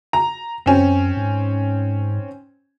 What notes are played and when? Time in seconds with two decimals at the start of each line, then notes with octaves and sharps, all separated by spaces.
0.13 A#5
0.66 F#2 C4 C#4
1.17 G#2